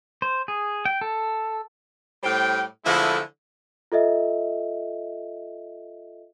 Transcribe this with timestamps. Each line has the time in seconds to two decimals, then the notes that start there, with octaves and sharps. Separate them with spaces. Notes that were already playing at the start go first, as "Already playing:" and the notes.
0.22 C5
0.48 G#4
0.85 G5
1.01 A4
2.23 A2 G3 C5 G5
2.85 D3 E3 F3 G#3 A3 E4
3.92 F4 A4 D#5 E5